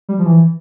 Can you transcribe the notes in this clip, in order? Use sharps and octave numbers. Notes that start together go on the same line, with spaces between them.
G3
F3
E3